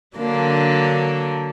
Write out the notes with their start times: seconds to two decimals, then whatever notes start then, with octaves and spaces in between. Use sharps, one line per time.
0.17 D3 F#3 A#3 D4